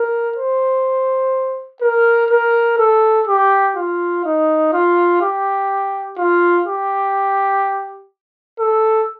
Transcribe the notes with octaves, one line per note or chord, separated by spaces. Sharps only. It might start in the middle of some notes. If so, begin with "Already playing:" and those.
Already playing: A#4
C5
A#4
A#4
A4
G4
F4
D#4
F4
G4
F4
G4
A4